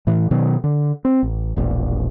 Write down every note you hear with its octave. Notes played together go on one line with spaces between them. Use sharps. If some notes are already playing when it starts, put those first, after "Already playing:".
A2 E3
B2 D#3 F#3
D3
C4
A1
E1 A#1